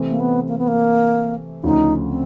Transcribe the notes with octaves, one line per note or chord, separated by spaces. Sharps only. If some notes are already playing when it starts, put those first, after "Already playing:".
Already playing: C3 E3 A3 C4
A#3
B3
A#3
B3
A#3
D2 C#3 F3 A3 D#4
C4